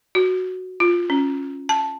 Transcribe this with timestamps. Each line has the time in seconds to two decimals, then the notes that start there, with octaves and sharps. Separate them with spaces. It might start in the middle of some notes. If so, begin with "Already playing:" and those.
0.15 F#4
0.80 F4
1.10 C#4
1.69 A5